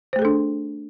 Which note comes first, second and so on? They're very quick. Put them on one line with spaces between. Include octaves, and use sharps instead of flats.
C5 A3 G#4 A4 D4